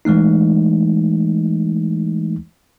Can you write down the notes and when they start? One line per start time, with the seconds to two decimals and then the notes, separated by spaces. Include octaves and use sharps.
0.05 E3 G#3 A3 D#4